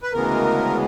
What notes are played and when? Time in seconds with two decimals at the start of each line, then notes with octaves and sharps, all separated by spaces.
0.03 B4
0.13 D2 C#3 E3 G#3 B3 A#4